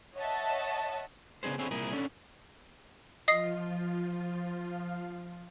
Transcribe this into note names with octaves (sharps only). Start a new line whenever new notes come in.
C#5 D#5 E5 F#5 A5
C#3 B3 D4 G#4 C5
D3 C4 E4 G#4 C#5
C2 A#2 E4 G#4 A#4
C#4 D4 A4
F3 F4 D#5 D#6 C7